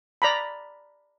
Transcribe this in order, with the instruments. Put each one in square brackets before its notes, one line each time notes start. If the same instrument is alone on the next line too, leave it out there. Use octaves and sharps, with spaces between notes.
[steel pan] D5 A#5 B5